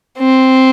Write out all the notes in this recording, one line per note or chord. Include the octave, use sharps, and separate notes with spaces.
C4